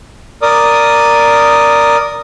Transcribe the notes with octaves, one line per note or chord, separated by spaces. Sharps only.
A#4 D5 D#6